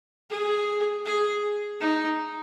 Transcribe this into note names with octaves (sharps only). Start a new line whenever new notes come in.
G#4
G#4
D#4